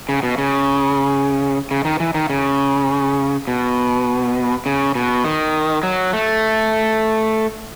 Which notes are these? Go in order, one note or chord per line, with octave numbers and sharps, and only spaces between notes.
C#3
B2
C#3
C#3
D#3
E3
D#3
C#3
B2
C#3
B2
D#3
F#3
A3